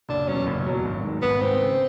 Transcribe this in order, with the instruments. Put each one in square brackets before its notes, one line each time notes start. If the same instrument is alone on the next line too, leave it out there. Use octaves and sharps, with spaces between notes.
[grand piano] F#1 [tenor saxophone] D4
[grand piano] E2 B2 F#3 [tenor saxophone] C#4
[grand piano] F#1
E2 B2 F#3
G#1
G#2 D#3
[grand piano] G#1 [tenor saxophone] B3
[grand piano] G#2 D#3 [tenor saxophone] C4
[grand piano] C#3